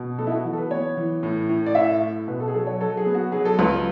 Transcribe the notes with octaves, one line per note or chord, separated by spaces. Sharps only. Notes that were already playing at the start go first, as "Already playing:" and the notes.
Already playing: B2
B3 A4
E4
F#4
E3 F#4
A4
B4
B3 C#5
E3
A2
A2
D5
A2 E5
A2
B2 B4
A4
G#4
F#3 A4
C#5
F#3 A4
G#4
B3
F#4
F#3 G#4
A4
C#2 B4